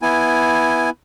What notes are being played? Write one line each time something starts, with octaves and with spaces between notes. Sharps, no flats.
B3 E4 G#5